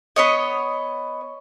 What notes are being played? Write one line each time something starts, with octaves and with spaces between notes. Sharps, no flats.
B3 C#5 D#5